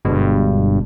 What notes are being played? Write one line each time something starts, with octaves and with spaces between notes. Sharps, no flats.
G1 G2 B2 G#3